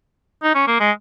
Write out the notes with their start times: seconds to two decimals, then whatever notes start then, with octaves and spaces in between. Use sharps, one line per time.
0.43 D#4
0.55 C#4
0.67 A#3
0.80 G#3